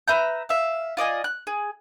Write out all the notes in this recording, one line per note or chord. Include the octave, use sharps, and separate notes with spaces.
B4 E5 A#5 G6
E5 F5
F4 D5 D#5 G#5
F#6
G#4